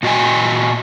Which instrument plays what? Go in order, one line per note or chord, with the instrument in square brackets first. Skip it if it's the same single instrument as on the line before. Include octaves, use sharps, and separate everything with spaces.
[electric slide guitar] A#2 F#4 D#5 G5 G#5